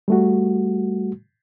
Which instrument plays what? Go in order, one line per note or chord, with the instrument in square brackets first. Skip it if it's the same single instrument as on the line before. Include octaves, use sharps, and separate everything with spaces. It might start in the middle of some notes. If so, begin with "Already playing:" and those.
[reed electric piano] G3 A3 F#4